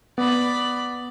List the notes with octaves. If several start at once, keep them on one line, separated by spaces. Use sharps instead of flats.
B3 D5 B5